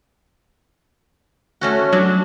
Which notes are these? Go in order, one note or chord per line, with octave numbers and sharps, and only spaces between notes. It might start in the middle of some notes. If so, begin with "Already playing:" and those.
A3 C#4 F#4
F#3 D4